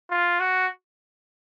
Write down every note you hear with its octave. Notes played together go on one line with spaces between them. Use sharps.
F4
F#4